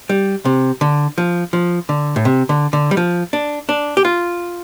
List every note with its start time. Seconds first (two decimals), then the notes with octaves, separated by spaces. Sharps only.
0.09 G3
0.45 C3
0.81 D3
1.18 F3
1.53 F3
1.89 D3
2.16 A2
2.25 C3
2.49 D3
2.73 D3
2.91 G3
2.97 F3
3.33 D4
3.69 D4
3.97 G4
4.05 F4